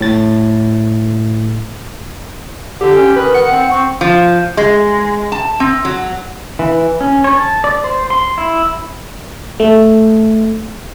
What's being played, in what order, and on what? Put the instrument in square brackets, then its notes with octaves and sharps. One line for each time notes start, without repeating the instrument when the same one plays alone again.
[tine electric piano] A2 A6
[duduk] D3 [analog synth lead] G4
[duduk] C#4
[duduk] D#3 [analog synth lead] B4
[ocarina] F#5 [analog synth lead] C#7
[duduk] C4
[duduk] C4 [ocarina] C#6
[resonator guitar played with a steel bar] F3
G#3
A5
C4
F#3
[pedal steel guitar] E3
C#4
C#5
A5
D5
C5
C6
E4
[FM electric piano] A3